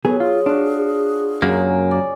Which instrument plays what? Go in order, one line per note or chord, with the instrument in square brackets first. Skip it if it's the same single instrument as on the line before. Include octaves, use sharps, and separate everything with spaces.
[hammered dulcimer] F#3 [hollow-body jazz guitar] B3 G#4 [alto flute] A4
[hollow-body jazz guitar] F4 [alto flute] G#4
[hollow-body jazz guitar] D4 [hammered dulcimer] F4 F#4
[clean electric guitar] F#2 A#3 [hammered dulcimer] C#3
[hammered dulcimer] D5